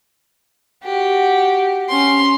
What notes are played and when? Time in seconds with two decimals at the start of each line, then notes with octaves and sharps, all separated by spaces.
0.83 F#4 G4
1.89 C#4 C6